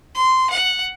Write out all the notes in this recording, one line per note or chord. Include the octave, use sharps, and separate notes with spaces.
C6
F#5